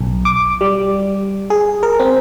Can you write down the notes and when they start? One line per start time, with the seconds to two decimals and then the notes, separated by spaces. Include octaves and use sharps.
0.01 B1
0.25 D6
0.61 G3
1.50 G#4
1.83 A#4
2.00 C4